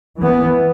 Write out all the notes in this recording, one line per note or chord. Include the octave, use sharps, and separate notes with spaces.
E3 B3